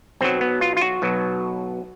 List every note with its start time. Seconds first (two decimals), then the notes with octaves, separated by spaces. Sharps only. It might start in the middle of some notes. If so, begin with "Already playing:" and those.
0.21 B1 B2 F#3 C4
0.41 B3
0.61 F4
0.77 F4
0.81 F#4
1.02 B1 B2 F#3